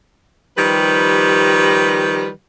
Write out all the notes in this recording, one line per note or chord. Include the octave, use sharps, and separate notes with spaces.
D#3 F3 G3 G4 B4